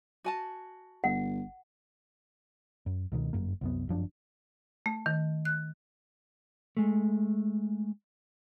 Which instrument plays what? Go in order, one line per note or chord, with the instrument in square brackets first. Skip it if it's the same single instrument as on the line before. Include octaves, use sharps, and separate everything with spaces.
[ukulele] F#4 G#5 A5
[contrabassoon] G1 [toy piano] F#5
[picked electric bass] F#2
C#2 B2 D#3
G1 F#2 A#3
C2 F#2 B3
G1 F#2 F3 D4
[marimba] A3
D#3
F#6
[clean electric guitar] G#3 A3